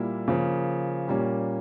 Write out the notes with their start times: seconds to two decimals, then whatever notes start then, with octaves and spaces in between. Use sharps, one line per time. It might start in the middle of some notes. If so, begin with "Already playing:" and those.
Already playing: A#2 G3 A#3 E4
0.28 C#3 F3 A#3
1.08 A#2 G3 A#3 C#4